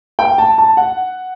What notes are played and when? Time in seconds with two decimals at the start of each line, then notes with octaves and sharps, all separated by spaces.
0.19 G5
0.38 A5
0.58 A5
0.77 F#5